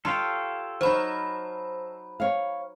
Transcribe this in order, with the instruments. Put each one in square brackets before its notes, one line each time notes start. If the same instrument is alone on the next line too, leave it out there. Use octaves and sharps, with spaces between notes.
[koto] F4 G4 [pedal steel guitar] A4 C#5 F5
[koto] F#3 D#4 [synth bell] C5 B5
[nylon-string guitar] C#5 F5